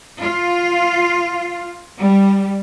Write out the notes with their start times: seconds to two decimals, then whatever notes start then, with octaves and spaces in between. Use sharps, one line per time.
0.21 F4
2.00 G3